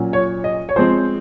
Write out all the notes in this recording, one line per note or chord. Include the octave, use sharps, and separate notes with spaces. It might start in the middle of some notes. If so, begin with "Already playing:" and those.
Already playing: A#2 F#3 C#4
C#5
D#5
C#5
F3 G#3 C4 C5